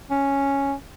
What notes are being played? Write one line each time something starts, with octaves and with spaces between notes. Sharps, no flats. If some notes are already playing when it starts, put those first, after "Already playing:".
C#4